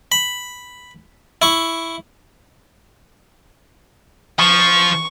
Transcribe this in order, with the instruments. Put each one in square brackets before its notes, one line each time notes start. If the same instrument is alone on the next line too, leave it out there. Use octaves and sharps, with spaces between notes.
[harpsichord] B5
E4 C#6
[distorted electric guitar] F3 [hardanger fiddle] C#6